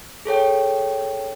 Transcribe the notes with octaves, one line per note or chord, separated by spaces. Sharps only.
G#4 A4 C#5 G5